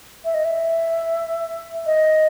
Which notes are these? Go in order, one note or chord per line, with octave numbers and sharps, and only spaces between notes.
E5
D#5
E5
D#5